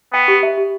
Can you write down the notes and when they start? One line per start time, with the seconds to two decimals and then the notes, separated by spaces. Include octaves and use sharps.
0.13 B3 G5
0.28 G4
0.43 E5
0.58 G4